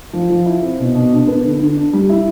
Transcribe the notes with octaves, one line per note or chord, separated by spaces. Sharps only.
F3
F3
E4
C4
B2
B2
D4
B3
D3
D3
D4
G3
E4